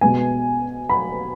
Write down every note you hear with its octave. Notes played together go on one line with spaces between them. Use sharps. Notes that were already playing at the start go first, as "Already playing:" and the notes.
B2 G#3 B3 G#5
B5